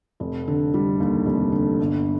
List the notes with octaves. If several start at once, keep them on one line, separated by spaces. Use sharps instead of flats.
F1
D3
G3
D#2
F1
D3
G1